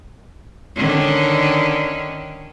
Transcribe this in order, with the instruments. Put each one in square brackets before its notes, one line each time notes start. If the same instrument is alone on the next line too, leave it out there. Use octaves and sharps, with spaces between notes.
[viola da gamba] D3 D#3 C#4